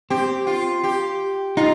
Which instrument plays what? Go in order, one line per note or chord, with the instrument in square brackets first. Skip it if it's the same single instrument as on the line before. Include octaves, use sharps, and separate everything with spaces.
[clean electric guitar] C4 [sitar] G4
[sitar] F4
G4
[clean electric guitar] D#4 [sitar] F4